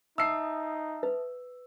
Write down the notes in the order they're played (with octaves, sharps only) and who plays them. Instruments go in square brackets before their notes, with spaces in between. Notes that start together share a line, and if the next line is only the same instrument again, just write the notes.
[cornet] D#4 [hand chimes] E5 A5 D#6 [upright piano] E6 C7
[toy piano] B4